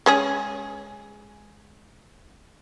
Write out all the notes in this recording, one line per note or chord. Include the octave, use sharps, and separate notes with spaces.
G#3 C#4 G#4